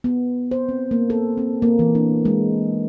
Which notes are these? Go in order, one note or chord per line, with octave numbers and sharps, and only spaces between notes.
B3
C5
C4
A#3
A4
C4
A#3
E3
D4
G#3